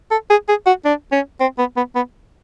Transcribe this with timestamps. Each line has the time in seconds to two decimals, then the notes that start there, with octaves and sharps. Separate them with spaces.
0.11 A4
0.30 G#4
0.48 G#4
0.66 F#4
0.85 D4
1.12 C#4
1.40 C4
1.58 B3
1.77 B3
1.96 B3